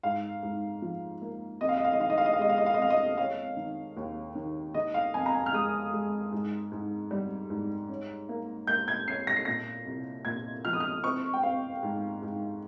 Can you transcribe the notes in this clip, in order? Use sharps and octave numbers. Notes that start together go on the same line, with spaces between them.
G#2 F5
G#2
F3
A#3
F2 D#5
F5
D#5
F5
D#5
D#3 F5
D#5
F5
D#5
F5
G#3 D#5
F5
D#5
F5
D#5
F2 F5
D#5
C#4 F5
D#3
D#2
D#3
D#3 D#5
F5
F2 G#5
A#5
G#5
F6
G#3 D#6
G#3
G#2
G#2
G3
G#2
C#4
A#3
A#3 G6
G#6
C#4 C7
A#6
C7
A#2 A#6
C2
A#2 G#6
F3 F6
D#6
F6
C4 C#6
G5
C4 F5
G#2
G#2